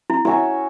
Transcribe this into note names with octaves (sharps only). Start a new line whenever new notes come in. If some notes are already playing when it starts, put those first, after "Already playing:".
E4
C#4 E4 F#4 C#5 E5